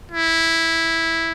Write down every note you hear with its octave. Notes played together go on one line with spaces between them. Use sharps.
E4